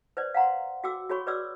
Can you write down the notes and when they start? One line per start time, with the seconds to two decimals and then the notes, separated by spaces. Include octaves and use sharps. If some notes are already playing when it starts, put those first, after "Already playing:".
0.17 B4 C5 D5
0.34 F5 F#5 A#5 C6
0.84 F#4 G5 D6 E6
1.09 F#4 G#4 C#5 B5 C#6
1.27 B4 C#5 D5 D6 E6